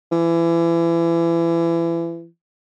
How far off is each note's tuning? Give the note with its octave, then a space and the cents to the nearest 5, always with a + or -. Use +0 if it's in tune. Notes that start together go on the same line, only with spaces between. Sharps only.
E3 +30